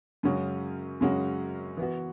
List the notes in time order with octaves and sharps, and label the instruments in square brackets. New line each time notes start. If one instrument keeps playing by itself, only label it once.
[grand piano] F#2 C#3 G#3 C#4 F#4
F#2 C#3 G#3 C#4 F#4
E3 B3 F#4